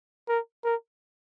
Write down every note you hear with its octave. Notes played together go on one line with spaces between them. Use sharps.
A#4
A#4